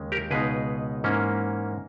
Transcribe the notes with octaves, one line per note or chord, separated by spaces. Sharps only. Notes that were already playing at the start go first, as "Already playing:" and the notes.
Already playing: D#2 C#3 G#3 C#4
G4 A#4
C#2 B2 G#3 D#4 G#4 B4
G#2 E3 A#3 C#4